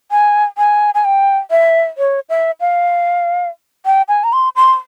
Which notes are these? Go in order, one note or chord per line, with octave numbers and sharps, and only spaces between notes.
G#5
G#5
G#5
G5
E5
C#5
E5
F5
G5
G#5
A#5
C6
C6